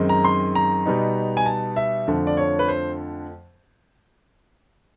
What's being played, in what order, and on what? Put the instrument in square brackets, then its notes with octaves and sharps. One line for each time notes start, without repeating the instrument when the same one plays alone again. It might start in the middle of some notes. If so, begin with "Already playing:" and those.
Already playing: [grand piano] F#2 D#3 G#3 C4 D#4
A#5
C6
A#5
B2 G3 B3 D#4
G#5
A5
E5
F2 D3 F3 A3
D5
C#5
B4
C5